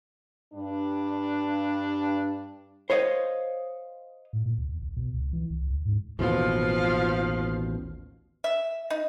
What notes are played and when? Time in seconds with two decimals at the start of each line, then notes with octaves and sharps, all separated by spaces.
0.54 G2 D4
2.90 C5 C#5 D#5 F5
4.33 A2
4.46 A#2
4.58 D2
4.69 D#2
4.82 B1
4.96 B2
5.14 C#2
5.33 E3
5.50 C2
5.70 D2
5.85 G#2
6.19 A1 D#2 B2 F3 F5
8.44 E5
8.90 D#4